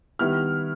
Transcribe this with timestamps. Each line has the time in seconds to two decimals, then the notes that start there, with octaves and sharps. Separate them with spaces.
0.19 D#3 G3 B3 E4 F6